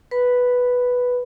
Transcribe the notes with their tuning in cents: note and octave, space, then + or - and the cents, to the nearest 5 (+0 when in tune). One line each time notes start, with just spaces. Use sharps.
B4 +0 B5 +5